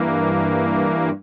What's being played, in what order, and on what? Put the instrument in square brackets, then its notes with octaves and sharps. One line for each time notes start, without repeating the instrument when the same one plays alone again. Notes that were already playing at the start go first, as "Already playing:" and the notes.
Already playing: [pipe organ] G2 E3 A#3